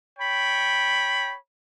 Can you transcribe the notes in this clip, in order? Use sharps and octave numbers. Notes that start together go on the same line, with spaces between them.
C#5 G5 B5